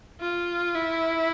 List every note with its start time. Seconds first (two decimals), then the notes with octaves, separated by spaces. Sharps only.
0.21 F4
0.75 E4